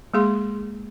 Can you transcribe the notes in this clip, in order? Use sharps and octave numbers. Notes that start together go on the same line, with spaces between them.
G#3 A#3 G#4 C6